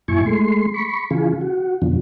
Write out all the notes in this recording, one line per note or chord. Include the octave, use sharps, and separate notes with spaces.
F#2 A#2 E4 G#5 C#6
G#3 A3 C6
B5 C#6
C#3 E3 F4 G#4
F#4
F2 B2 D3 F3